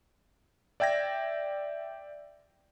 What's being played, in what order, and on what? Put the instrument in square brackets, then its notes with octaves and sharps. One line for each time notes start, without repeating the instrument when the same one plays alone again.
[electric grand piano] D5 E5 G5 G#6 A#6